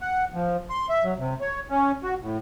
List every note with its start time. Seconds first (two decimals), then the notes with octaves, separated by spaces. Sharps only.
0.01 F#5
0.34 F3
0.70 C6
0.89 E5
1.04 F#3
1.19 C3
1.41 C#5
1.70 C#4
2.03 F#4
2.22 A2